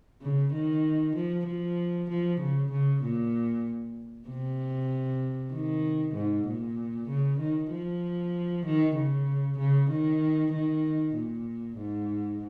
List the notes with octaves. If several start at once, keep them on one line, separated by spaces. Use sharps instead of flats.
C#3
D#3
F3
F3
F3
C#3
C#3
A#2
C3
D#3
G#2
A#2
C#3
D#3
F3
D#3
C#3
C#3
D#3
D#3
A#2
G#2